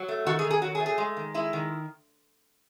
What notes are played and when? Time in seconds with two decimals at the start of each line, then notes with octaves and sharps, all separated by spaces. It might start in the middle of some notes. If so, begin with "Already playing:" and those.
Already playing: F#3
0.08 A3
0.26 D#3 F#4
0.39 G#4
0.44 D#3
0.51 G#4
0.62 F#3 F#4
0.75 G#4
0.80 A3
0.86 G#4
0.98 G#3
1.17 D#3
1.34 G#3 E4
1.53 D#3